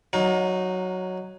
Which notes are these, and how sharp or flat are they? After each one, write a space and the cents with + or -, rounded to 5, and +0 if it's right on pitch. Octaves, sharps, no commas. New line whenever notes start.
F#3 +0 D#4 +0 F5 +40